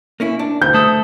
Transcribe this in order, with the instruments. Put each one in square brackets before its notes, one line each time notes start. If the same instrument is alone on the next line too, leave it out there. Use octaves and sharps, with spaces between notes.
[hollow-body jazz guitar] A#3 C#4 E4
D4
[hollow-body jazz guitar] D2 [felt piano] G6
[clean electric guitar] A3 A4 [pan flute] D#6